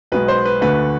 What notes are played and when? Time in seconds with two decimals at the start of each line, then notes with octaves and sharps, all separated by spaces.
0.12 B1 B2 G#3 B4
0.28 C5
0.45 B4
0.61 D2 D3 A3 B4